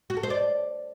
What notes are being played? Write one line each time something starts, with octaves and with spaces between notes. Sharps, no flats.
F#4
A4
C5
D5